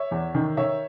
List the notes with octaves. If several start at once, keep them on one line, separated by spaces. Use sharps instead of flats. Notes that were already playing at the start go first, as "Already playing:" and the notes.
Already playing: C#5 E5
E2
D#3
D#3 C#5 E5